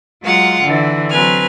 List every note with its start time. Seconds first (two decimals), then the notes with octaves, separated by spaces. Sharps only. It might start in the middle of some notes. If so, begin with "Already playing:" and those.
0.22 F#3 G#3 F4 F5 F#5
0.61 D3 E3
1.10 F#3 C4 B4 G#5 F6